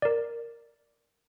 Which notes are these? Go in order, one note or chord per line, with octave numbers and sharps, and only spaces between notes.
A#4 D5